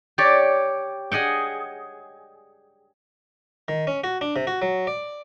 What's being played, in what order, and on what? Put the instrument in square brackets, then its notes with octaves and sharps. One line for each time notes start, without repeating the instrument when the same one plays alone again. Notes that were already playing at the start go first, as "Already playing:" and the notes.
[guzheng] G4 C#5 D5
G#4 D#5 F#5 G5
[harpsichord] D#3
C#4
F#4
D4
C3
F#4
F#3
D5